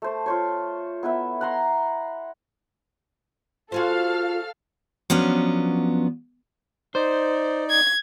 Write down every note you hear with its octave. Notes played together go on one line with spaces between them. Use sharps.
A3 C5
F4 C5 C#5
B3 E4 B4 E5
F#5 A#5 C6
F4 F#4 G#4 A4 C5 F5 F6
F3 F#3 B3 C#4 D4
D#4 C5 D5
G#6